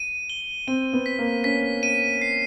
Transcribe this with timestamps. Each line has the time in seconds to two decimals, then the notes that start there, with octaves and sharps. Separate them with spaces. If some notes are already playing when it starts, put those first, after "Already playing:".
Already playing: D#7
0.30 G7
0.67 C4 D#7
0.93 B3
1.06 B6
1.19 A#3
1.44 C#4 B6
1.83 D#7
2.22 C7